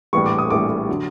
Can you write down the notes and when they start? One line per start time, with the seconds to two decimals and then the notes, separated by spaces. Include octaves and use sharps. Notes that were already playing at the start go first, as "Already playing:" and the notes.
0.13 A#1 A2 E3 G3 C#6
0.26 D6
0.39 D#6
0.50 A#1 A2 E3 G3 D6
0.89 D3 F#3